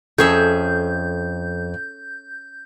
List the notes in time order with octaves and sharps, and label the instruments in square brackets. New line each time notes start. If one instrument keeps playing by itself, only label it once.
[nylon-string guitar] F2 [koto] C#4 G#4 E5 [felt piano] A4 [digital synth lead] G6